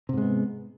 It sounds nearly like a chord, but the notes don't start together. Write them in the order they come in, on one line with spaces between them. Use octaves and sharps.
C3 G#2 G#3 B3